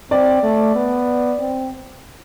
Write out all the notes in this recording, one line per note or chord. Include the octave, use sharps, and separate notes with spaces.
C4 D5
A3
B3
C4